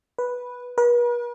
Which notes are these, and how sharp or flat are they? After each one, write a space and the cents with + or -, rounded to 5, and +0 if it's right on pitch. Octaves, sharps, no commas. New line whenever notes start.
B4 -5
B4 -45